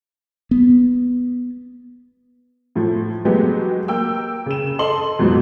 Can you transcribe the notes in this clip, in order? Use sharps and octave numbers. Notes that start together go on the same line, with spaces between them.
B3
A2 F3 A3
F#3 G#3 A3 B3 F#4 G4
A#3 G5 E6
C#3 E7
A4 D#5 C6 F#7
F2 G#2 B2 F#3